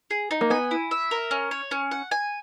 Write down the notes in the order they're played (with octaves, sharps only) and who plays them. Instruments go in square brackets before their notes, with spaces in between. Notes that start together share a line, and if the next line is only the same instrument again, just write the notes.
[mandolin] G#4
D#4
[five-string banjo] A#3
[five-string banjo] B3 [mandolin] G#5
[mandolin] E4
E5
A#4
C#4
C#5
C#4
F#5
G#5